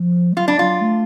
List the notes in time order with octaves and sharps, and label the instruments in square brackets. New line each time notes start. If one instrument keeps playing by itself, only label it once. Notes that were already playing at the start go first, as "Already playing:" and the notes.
Already playing: [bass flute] F3
G#3
[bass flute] F#3 [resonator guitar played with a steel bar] F4
[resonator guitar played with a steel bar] D4
[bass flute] F#3 [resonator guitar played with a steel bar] F4
[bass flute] A3